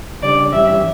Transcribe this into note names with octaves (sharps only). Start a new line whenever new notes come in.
C#3 G3 D4 D5
G2 E3 G3 C#4 E5